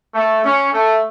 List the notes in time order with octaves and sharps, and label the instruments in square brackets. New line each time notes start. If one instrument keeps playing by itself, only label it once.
[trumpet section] A3
C#4
A3